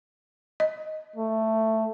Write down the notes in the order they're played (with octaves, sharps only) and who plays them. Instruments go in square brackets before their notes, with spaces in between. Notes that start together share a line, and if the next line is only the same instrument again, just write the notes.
[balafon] D#5
[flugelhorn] A3